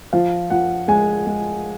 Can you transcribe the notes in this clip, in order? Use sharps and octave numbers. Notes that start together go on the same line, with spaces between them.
F3 F5
F3 F#5
G#3 G#5
G#3